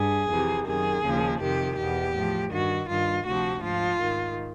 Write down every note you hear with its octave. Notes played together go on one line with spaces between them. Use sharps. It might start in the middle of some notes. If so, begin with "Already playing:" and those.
Already playing: G2 G#4
F2 C3 E3
F#2 D#3 G#4
D#2 C#3 F3
F2 C3 D#3 G4
E2 B2 G4
A2 F3
G2 D#3 F#4
G2 D#3 F4
D2 C3 F3 F#4
G#2 F3 F4
G#2 D#3